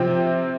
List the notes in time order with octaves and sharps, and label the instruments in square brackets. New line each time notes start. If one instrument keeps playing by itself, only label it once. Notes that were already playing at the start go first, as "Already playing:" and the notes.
Already playing: [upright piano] C3 F3 C4